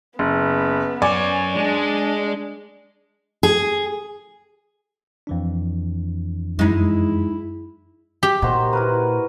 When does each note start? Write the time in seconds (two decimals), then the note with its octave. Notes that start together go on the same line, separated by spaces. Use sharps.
0.19 F#1 B3
1.02 F#2 C#5 D5 G#5 D6
1.56 G#3 D4 G#4
3.43 G#4
5.27 F2 E3 D4
6.59 F#2 G#3 D#4 E4
8.23 G4
8.42 A#2 D#3 F#4 C5
8.73 E4 A#4 B4